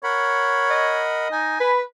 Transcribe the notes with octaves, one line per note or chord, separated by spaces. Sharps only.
A#4 C#5 F#5 B5
D#5
D#4 G#5
B4 B5